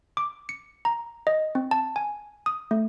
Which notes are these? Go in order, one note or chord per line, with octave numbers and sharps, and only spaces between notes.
D6
C#7
A#5
D#5
C4
A5
G#5
D#6
A3